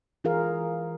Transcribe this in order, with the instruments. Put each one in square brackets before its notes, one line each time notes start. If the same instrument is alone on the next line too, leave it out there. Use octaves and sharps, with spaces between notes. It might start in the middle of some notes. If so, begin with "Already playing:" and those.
[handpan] E3 F4 G#4 A#4 F5